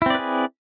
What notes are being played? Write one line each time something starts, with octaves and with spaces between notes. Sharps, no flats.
C4 E4 G#4 B4 D5